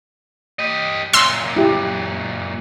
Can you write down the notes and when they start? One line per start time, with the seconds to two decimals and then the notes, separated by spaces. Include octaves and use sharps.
0.59 G4 D#5
1.13 F#2 A#2 C6 E6
1.57 E4 G4